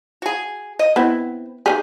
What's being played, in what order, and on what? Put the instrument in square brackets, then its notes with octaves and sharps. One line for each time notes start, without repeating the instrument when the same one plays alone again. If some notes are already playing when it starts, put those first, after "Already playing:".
[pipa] F#4 G#4
D#5
[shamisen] B3 [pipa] C4 E4
[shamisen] D#3 G3 G#4 [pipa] G4